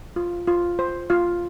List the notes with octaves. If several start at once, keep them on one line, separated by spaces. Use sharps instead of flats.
F4
F4
C5
F4 F5